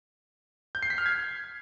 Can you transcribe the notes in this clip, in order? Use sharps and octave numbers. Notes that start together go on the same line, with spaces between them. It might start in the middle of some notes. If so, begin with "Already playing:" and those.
G6
C7
B6
F6
G#6